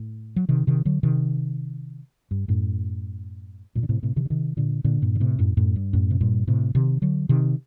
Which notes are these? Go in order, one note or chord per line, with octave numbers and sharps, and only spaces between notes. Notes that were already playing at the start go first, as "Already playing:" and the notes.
Already playing: A2
F#3
C3 D#3
C3 D#3
D3 F#3
C3 D#3
G2
F#2 A2
G2 A#2
D3
A2 C3
A2 C3
C3 D#3
D3
C3 D#3
A#2 D3
A#2 D3
G2 A#2
D3
A2 C3
F#2 A2
F#2 A2
G2
F#2 A2
C3
G2 A#2
A2 C3
C3 D#3
D3 F#3
C3 D#3